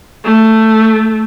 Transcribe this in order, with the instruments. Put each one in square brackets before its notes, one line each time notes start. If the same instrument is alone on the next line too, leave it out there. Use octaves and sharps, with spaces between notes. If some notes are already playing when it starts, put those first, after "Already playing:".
[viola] A3